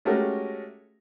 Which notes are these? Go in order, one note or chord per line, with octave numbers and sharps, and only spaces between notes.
G#3 A3 C#4 F#4 G4 A#4